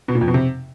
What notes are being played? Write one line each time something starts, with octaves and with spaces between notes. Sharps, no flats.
B2
A#2
F2
B2
C3